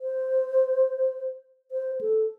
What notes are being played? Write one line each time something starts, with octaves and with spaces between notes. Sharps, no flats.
C5
C5
A4